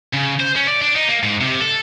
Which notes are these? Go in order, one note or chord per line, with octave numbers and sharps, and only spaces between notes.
C#3
C5
C#4
D5
D4
D#4
A#3
G#2
C3
A4